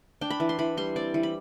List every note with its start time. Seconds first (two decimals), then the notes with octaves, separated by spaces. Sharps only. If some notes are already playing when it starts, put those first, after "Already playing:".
0.21 D4 G5
0.30 B5
0.40 E3
0.49 C6
0.59 E3 B5
0.77 G3 C6
0.96 C4 D5
1.14 E3
1.23 B5